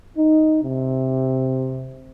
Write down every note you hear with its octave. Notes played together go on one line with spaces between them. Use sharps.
D#4
C3